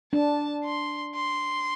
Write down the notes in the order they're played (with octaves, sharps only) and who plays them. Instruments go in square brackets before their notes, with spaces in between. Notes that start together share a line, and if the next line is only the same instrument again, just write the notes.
[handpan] D4 [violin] A5
[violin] C6
C6